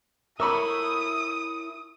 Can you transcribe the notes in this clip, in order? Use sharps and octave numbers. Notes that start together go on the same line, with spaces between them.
E4 A#4 C#5 E5 B5 C#6 D#6 E6